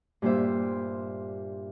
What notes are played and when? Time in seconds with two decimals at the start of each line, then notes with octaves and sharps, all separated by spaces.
0.22 G2 A#2 G3 C5 E5